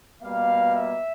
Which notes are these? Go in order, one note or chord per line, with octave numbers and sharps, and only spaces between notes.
B2 G3 A#3 F5
E5